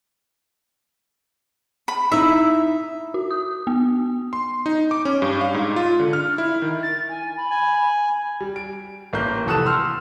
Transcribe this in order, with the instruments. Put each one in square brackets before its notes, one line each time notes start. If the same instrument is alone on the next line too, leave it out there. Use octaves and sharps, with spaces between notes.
[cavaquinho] B5
[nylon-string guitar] D#4 E4 [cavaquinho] E5
[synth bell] F#4
D#6
B3
[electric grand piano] C6
D#4
D6
C#4
G2
F5
G#2
F4
D3
F6
E4
D#3
[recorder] A6
G#5
B5
[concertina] G#5
[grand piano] G3
D7
A1 A#3 A#4 G6
F1 E3 A4 D#6 F#6 E7
C6 E6 F6